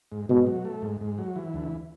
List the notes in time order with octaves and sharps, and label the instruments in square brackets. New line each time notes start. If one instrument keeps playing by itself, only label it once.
[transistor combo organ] G#2
[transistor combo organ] G#2 [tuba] B2
[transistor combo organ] F#3
A3
G#2
G#2
F#3
E3
D2